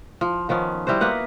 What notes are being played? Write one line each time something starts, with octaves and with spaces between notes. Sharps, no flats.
F3
D#3 F3 B3 C#4
G3 E4 F#4 C5
A#3 B3 B4 F#5